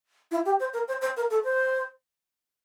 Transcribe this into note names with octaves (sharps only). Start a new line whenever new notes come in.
E4
G4
C5
A#4
C5
C5
A#4
A4
C5